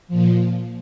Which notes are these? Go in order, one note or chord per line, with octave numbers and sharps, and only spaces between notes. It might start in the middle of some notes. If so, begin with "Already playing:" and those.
A#2 F3